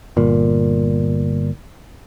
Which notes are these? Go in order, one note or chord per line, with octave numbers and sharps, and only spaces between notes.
G1 A#2